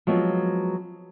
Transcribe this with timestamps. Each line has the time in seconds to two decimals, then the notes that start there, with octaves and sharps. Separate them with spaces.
0.07 F3 F#3 G#3 B3 C4